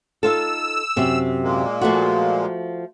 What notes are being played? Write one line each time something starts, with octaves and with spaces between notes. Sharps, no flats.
D#4 F4 A4 E6
F#2 C3
A#2 G#3 A#3
F3 A3 F#4